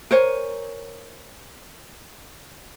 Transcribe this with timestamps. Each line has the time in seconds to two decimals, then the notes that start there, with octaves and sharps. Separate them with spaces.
0.11 A#4 C5 C#5 G#5